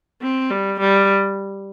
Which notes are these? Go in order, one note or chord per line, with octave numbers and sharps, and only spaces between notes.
C4
G3
G3